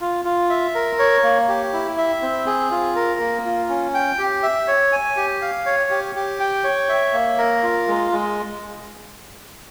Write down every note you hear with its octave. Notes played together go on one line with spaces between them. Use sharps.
F4
F4
E5
A#4
C#5
A#3
G4
E4
E5
C4
G#4
F4
A#4
A#3
F4
C#4
G5
G4
E5
C#5
G#5
G4
F5
C#5
G4
G4
G5
C#5
E5
A#3
A#4
F4
G#3
G#3